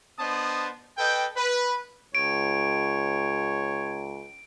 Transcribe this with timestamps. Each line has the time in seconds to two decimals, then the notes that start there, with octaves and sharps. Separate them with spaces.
0.19 B3 D4 C5 D#5 A5 D#6
0.98 A4 B4 D#5 G5
1.36 B4
2.15 C#2 C#5 D7